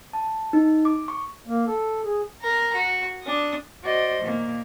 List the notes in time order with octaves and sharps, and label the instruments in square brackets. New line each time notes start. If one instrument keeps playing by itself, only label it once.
[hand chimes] A5
D#4
D6
C#6
[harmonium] A#3
A4
G#4
[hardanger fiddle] A#4 A#5
F#4
D4 D#6
[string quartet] F#4 C5 D5 D#5
A#2 D#3 A#3